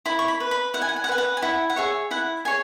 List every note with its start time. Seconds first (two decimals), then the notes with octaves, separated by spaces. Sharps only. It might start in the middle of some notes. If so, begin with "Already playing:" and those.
0.06 E4 B5
0.19 C#6
0.28 B5
0.40 B4
0.51 B5
0.74 E4 F#5
0.82 G#5
0.89 F#5
0.96 G#5
1.04 F#5
1.09 B4 G#5
1.18 F#5
1.37 G#5
1.42 E4 F#5
1.70 F#5
1.76 G#4 C#5 E5
2.11 E4 F#5
2.45 G#4 C#5 G#5